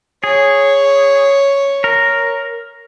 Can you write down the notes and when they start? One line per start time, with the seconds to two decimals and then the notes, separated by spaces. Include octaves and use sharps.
0.24 G#4 C#5
1.84 A#4